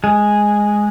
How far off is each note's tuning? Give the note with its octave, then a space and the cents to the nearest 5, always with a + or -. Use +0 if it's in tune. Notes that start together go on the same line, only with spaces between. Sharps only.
G#3 +0 G#4 +0